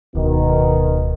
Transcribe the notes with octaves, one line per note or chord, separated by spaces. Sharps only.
D1 B2 D#3